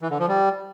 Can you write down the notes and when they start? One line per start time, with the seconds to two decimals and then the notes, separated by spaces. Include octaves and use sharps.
0.01 E3
0.10 D3
0.19 F3
0.28 G3